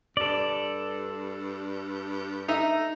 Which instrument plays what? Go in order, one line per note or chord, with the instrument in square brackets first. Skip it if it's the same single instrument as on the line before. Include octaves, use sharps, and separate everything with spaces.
[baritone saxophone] G2 [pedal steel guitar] A4 D5
[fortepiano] D#4 D#5 E5